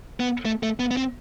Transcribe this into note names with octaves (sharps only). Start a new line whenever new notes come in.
B3
A3
A3
B3
B3
C4